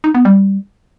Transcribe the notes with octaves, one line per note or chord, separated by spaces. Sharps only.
D#4
B3
G3